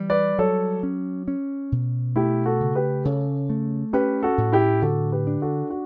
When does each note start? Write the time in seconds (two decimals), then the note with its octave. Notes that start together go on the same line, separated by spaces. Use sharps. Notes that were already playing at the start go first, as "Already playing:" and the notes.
Already playing: E3 G3
0.10 B4 D5
0.39 F#3 A4 C#5
0.83 C#4
1.28 C#4
1.72 B2
2.16 A3 E4 G4
2.46 F#4 A4
2.60 C#3
2.75 G4 B4
3.04 C#3 A4 C#5
3.49 A3
3.93 C#4 G4 B4
4.23 F#4 A4
4.38 A2
4.52 E4 G4
4.82 D3 F#4 A4
5.12 G4 B4
5.27 D4
5.42 F#4 A4
5.70 F#4